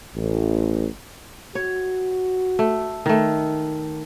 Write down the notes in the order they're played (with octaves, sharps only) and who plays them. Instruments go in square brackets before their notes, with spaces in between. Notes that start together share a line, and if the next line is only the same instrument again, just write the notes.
[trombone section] A1
[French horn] F#4 [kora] C#5
[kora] A3
D#3 A3